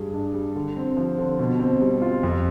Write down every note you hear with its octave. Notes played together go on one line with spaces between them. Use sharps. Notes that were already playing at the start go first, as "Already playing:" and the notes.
Already playing: G2 G3 G#4
D4
G3
D3
C4
F3
D3
B2
C4
G3
F4
F2